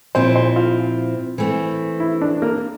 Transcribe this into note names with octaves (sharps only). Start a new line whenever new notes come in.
A#2 F3 C4 E4 C5
C5
F4
E3 A3 C4
E4
D4
A#3